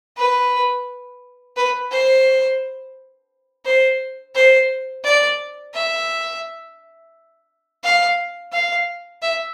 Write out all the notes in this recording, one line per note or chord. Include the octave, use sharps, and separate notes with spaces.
B4
B4
C5
C5
C5
D5
E5
F5
F5
E5